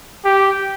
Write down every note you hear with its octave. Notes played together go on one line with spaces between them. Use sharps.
G4